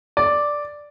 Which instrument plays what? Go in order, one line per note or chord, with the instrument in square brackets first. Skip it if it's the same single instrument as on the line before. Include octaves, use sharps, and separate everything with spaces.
[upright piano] D5